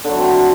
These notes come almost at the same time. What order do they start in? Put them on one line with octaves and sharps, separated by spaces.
D3 F#3 E4 C4